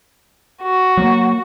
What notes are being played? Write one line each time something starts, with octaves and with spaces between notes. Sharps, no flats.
F#4
F#3 A#3